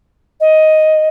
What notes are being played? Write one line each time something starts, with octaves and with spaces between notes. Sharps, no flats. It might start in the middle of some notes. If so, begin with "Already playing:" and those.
D#5